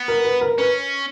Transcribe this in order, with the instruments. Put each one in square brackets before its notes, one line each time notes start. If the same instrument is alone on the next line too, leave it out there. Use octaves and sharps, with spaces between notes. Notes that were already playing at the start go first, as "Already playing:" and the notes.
Already playing: [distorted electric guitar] B3
[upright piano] A#4
B4
A#4
[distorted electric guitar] C#4 [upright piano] B4